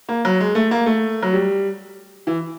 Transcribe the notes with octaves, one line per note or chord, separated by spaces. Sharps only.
A#3
F#3
G#3
A3
A#3
A3
F#3
G3
E3